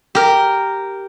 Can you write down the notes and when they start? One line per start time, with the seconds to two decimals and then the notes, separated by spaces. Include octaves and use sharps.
0.15 G4 A#4